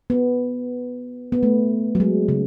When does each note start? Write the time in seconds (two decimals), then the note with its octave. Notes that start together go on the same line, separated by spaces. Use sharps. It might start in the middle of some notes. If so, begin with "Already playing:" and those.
0.10 B3
1.32 B3
1.43 A3
1.95 F#3
2.00 G#3
2.28 C#3